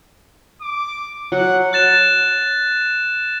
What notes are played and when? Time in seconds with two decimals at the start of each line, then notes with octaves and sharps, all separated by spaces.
0.61 D6
1.32 F#3 F#5
1.73 F#6 A6 E7